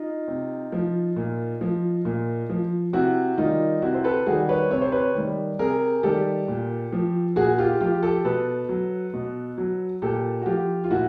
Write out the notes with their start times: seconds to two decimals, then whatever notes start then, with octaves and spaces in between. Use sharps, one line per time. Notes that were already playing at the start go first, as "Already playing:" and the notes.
Already playing: D#4 F4
0.28 C3
0.72 F3
1.16 A#2
1.61 F3
2.05 A#2
2.50 F3
2.93 C3 E4 F#4
3.37 D#3 G3 D#4 F4
3.82 C3 E4 F#4
3.94 C5
4.04 A4 B4
4.26 D#3 G3 F#4 G#4
4.49 B4 C#5
4.71 C3 C#5
4.82 C5
4.92 B4 C#5
5.15 D#3 G3
5.59 C3 G#4 A#4
6.03 D#3 G3 G4 A4
6.48 A#2
6.92 F3
7.36 A#2 F#4 G#4
7.58 F4 G4
7.81 F3 F4 G4
8.03 G4 A4
8.25 B2 A4 B4
8.69 F#3
9.14 B2
9.58 F#3
10.02 A#2 G4 A4
10.42 F#4
10.46 F3 F4 G4
10.84 F4
10.90 A#2 E4 F#4